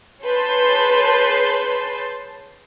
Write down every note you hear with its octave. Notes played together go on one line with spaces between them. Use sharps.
G#4 B4 C#5 A5 C6 G6